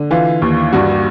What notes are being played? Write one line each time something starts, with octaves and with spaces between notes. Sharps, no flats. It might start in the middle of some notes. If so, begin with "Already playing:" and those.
Already playing: D3
E3 F4
D#2
G2 F#4